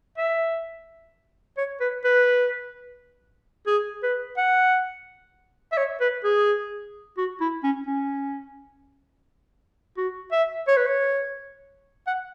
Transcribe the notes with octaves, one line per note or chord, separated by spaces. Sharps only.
E5
C#5
B4
B4
G#4
B4
F#5
E5
C#5
B4
G#4
F#4
E4
C#4
C#4
F#4
E5
C#5
B4
C#5
F#5